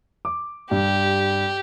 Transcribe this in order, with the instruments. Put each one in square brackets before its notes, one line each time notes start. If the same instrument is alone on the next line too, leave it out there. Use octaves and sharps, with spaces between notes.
[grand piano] D6
[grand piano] G2 [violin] G4